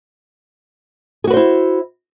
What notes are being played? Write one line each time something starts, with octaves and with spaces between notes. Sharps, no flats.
E4 F#4 G#4 B4 C5